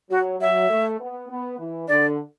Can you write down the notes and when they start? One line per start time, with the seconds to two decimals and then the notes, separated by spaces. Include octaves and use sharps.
0.11 F#3 F#4
0.41 F#3 E5
0.70 A3
1.00 B3
1.30 B3
1.59 E3
1.88 D3 D5